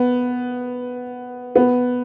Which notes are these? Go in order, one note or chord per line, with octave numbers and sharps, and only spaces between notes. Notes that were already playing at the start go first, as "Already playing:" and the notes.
Already playing: B3
B3